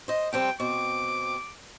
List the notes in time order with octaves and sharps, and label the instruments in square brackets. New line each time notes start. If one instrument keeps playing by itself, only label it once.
[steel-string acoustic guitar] C5 D#5
[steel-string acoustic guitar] F2 G3 C4 [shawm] G5
[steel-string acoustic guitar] B2 C4 [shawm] D6